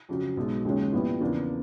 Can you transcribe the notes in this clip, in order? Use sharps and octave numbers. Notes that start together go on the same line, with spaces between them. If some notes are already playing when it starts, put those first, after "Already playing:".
F2 C#3 F#3
B1 B2 G#3
D#2 C#3 F3 G#3 C#4
A#1 A#2 G3 B3 E4
E2 C#3 F3 A#3 D4